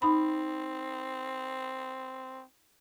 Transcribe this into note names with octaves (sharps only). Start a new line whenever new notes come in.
C4 D#4 B5